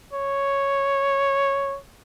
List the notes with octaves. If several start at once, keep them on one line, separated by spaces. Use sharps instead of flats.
C#5